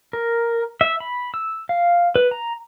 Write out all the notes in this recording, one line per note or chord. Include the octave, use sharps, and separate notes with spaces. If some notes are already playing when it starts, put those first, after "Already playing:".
A#4
E5
B5
E6
F5
B4
A#5